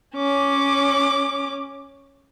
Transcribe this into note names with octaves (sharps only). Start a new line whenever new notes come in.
C#4 D6